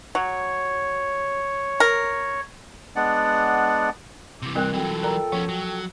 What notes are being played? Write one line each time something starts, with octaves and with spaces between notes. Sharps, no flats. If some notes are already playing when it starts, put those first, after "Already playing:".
F#3 C#5
A#4
G#3 B3 D4 D5 F#5
C3 E3 D6
G3 C4 A#4 G5 F#6
E3 F#3 C4 F4 A4 G5
A#4 D5 A#5
F3 B3 C#4
F#3